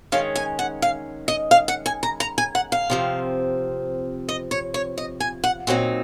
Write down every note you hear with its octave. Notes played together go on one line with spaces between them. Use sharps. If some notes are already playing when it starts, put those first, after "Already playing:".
D#3 G#3 C#4 F5
G#5
F#5
F5
D#5
F5
F#5
G#5
A#5
A#5
G#5
F#5
F5
C3 F3 C4
D#5
C#5
C#5
D#5
G#5
F#5
A#2 F#3 C4 D#4 F#5